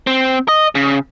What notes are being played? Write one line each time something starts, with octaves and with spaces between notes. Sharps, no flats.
C4
D#5
C#3